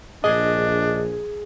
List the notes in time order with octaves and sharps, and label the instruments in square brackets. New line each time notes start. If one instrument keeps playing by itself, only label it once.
[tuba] A#1 [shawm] D4 [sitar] G#4 [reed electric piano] D#5